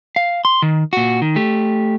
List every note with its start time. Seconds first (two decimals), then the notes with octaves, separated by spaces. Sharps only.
0.16 F5
0.45 C6
0.62 D#3
0.93 A#2 F#4
1.22 D#3
1.36 A3 G4